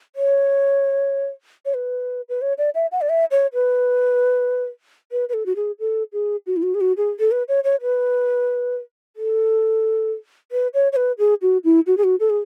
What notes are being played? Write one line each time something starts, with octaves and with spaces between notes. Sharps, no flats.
C#5
C#5
B4
B4
C#5
D5
E5
F#5
D5
E5
C#5
B4
B4
B4
A4
F#4
G#4
A4
G#4
F#4
E4
F#4
G#4
F#4
G#4
A4
B4
C#5
C#5
B4
A4
B4
C#5
C#5
B4
G#4
F#4
E4
F#4
G#4
F#4
A4
G#4